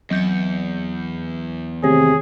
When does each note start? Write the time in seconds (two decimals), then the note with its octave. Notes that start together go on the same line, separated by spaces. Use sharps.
0.10 E2 F#3 G6 C#7
1.83 C3 D#3 G#4 C#5